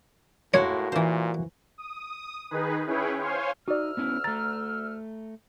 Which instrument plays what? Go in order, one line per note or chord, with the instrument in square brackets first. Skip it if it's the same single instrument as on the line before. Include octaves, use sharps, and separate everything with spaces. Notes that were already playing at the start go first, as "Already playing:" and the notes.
[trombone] A2 [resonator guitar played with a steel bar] G#3 A#3 F#4 [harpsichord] C#5
[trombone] A#2 [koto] E3 C5
[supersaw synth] D#6
D#3 D#4 G#4 B4
C#4 E4 G#4 B4 C#5 G5
C5 C#5 F5 G#5 C6
[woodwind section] D2 E6 F6 [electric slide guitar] D#4 [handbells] F#4 D5
[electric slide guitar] B3 C#4 E4
[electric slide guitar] A3 A#5 [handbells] A6